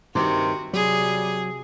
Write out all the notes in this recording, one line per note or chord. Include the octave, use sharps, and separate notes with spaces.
G2 C3 D#3 F#4
C3 F#3 G3 G#4